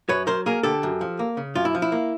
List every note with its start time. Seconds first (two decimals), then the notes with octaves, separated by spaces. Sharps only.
0.09 F#2 B4 C#5
0.27 F#3 A#4 C5
0.46 A#3 G#4 A#4
0.63 D3 G4 A4
0.83 F#2
1.01 F3
1.19 A#3
1.37 C#3
1.55 F#2 F4
1.65 E4
1.75 F3
1.82 E4
1.92 A#3